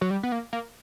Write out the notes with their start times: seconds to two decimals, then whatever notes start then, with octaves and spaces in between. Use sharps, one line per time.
0.01 F#3
0.10 G3
0.23 B3
0.32 A#3
0.53 A#3